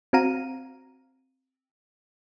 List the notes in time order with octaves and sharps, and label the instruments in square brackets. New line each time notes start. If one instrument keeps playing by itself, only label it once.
[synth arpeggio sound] C4 F#4 F5 A#5 D#7